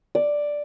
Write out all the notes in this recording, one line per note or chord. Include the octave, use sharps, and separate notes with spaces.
D5